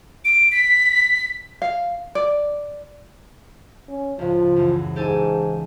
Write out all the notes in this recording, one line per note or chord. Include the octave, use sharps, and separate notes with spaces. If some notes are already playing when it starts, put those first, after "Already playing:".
D7
B6
F5
D5
C#4
C#2 A2 F3
F#2 E3
G#2 G4 A4 G#5